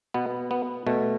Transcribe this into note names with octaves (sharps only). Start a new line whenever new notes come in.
B2 B3
B3
B2 A3